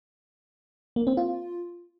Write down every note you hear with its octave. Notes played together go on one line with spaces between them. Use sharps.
A#3
C4
F4